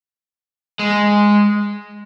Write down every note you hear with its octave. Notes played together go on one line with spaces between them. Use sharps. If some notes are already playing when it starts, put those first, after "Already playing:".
G#3